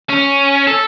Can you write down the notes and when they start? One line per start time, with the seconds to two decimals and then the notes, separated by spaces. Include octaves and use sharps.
0.09 C#4
0.67 A4